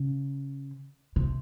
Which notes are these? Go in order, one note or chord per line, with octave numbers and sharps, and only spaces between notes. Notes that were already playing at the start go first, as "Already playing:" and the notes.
Already playing: C#3
C3